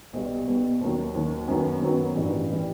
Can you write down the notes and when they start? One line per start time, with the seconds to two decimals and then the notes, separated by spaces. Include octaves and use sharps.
0.13 B1 B2 G3
0.47 B1 B2 G3
0.81 D#2 D#3 F#3
1.15 D#2 D#3 F#3
1.48 F#2 D#3 F#3 B3
1.81 F#2 D#3 F#3 B3
2.16 A1 G2 E3 G3
2.51 E3 G3